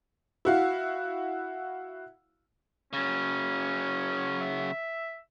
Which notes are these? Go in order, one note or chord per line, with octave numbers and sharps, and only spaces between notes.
E4 F#4 F5
C#3 F#3 C#4
E5